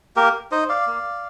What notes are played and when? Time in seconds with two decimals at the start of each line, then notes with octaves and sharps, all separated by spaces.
0.16 A#3 G4 A#4
0.51 D#4 C5 D#5
0.69 D5 F5
0.87 A#3